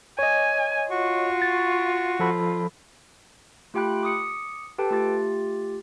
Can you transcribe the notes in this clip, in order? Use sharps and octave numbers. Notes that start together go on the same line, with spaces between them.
C#5 D#5 G#5
F4 F#4 C#6
A6
F3 A4 B5
A3 F4 G4 G5 B5 F#6
D6 D#6 C#7
G4 A4 B4 G5 A5
A3 F4 G4 A6